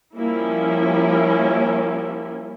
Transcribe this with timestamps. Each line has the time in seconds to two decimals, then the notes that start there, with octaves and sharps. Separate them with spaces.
0.15 F3 G3 A#3 C#4 E4